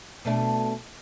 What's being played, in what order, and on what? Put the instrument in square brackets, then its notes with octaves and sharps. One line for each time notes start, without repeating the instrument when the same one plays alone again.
[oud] B2 A3 D4